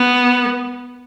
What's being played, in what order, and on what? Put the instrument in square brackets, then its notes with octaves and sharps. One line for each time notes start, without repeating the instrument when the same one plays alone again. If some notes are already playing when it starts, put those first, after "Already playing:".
Already playing: [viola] B3